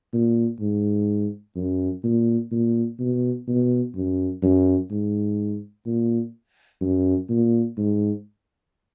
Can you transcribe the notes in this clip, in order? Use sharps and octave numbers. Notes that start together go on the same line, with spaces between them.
A#2
G#2
F#2
A#2
A#2
B2
B2
F#2
F#2
G#2
A#2
F#2
A#2
G#2